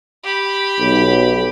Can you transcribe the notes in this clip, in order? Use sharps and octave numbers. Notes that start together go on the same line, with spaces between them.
G4 B5
B1